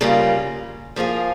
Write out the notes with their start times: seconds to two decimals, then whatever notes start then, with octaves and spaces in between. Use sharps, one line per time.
0.01 C#3 G3 A#3 F4
0.96 F3 A#3 F4 G#4